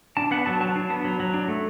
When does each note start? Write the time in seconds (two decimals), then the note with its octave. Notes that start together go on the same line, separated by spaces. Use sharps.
0.17 D4 A5
0.31 B3 F#5
0.46 F#3 A5
0.60 F#3 A5
0.76 D4
0.90 B3
1.05 F#3
1.20 F#3
1.34 D4
1.48 A3